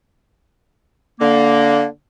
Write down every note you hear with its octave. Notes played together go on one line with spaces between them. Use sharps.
D3 A#3